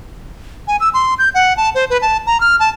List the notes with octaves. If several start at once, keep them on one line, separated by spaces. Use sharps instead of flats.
G#5
E6
C6
G6
F#5
A5
C5
B4
A5
A#5
F6
A5